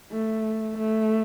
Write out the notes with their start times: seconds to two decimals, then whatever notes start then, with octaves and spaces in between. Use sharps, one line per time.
0.12 A3
0.78 A3